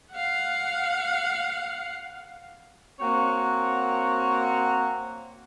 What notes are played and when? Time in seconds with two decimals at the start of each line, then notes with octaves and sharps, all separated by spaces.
0.12 F5 F#5
2.99 A#3 C4 F#4 C#5 F#5